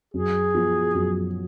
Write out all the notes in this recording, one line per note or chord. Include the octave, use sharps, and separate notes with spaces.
F#2 G#4
F3 B3 F4
F#2